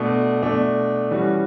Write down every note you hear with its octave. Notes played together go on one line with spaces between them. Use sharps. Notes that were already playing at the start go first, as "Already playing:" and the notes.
Already playing: B2 A3 D4
B2 A3 D4
E3 G3 C#4 F#4